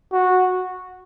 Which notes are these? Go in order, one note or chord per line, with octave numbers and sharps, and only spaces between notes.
F#4